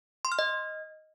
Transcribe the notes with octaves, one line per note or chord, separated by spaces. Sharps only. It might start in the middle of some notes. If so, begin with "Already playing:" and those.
C6
F6
D#5